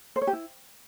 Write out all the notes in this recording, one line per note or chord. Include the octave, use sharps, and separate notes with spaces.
C5
C#5
G4
E4